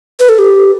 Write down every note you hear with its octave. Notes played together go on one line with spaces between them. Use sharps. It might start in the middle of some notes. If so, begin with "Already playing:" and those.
B4
A4
G4